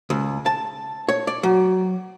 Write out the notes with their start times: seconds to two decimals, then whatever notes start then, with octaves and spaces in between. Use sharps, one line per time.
0.10 C#2
0.46 A5
1.09 C#5
1.27 D5
1.43 F#3